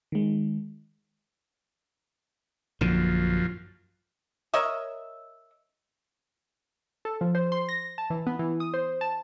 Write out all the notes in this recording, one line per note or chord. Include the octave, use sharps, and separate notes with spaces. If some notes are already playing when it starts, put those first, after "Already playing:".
D#3 G#3
A#1 F#2 D3 F3
A#4 C#5 D#5 E5
A4
F3
C5
C6
A#6
A5
E3
B3
E3
D#6
C5
A5